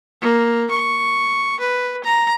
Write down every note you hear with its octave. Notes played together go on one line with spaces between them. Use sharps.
A#3
C#6
B4
A#5